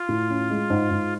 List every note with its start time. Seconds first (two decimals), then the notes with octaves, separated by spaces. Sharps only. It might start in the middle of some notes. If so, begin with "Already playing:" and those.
Already playing: F4
0.09 A2
0.30 C#4
0.50 G#3
0.70 G#2
0.91 G#2